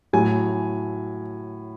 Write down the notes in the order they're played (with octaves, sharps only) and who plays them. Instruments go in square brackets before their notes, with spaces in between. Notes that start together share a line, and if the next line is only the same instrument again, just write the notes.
[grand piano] A2 F#3 G#5